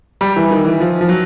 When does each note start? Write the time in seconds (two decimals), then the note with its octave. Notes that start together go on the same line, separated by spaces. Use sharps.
0.21 G3
0.36 E3
0.51 D#3
0.65 E3
0.80 F3
1.01 F3
1.09 F#3